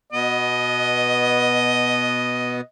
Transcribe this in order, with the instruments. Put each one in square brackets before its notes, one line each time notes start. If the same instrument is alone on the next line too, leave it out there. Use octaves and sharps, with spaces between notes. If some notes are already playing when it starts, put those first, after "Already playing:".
[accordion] B2 B3 [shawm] D#5